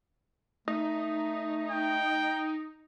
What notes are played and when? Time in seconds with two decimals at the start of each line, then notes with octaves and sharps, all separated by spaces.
0.68 A3 D#4
1.71 G5